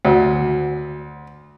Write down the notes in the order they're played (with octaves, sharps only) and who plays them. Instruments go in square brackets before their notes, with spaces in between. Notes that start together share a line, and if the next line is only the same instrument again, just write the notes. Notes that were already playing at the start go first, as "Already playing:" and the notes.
[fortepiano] D2